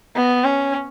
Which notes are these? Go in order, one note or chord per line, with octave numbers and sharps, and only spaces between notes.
B3
C#4